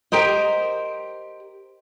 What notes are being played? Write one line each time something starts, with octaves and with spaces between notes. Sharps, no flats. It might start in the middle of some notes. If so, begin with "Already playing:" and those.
G4 A#4 C5 D#5